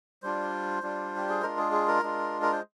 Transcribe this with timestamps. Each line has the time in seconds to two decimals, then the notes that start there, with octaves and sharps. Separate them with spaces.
0.23 G3 D4 F4 C5
0.83 G3 D4 F4
1.16 G4
1.29 G#4
1.42 G#3 D4 F4 A#4
1.58 G#4
1.72 G#4
1.88 A#4
2.03 G#3 D4 F4
2.42 A#4
2.52 C5